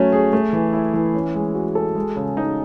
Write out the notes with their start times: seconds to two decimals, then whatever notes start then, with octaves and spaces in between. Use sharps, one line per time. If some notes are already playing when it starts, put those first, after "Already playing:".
Already playing: F#3 A3 C#4
0.12 G#4
0.33 A3
0.53 E3
0.73 E4
0.94 E3
1.14 C#4
1.34 G#3
1.55 F#4
1.75 A4
1.95 G#3
2.16 C#3
2.37 D#4